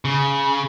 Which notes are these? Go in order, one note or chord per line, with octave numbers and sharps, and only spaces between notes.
C#3